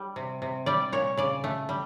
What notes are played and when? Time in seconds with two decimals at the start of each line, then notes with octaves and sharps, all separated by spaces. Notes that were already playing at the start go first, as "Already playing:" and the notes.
Already playing: G3
0.16 C3
0.42 C3
0.66 G3 D5
0.92 A#2 C#5
1.17 C#3 D5
1.44 A3
1.69 G3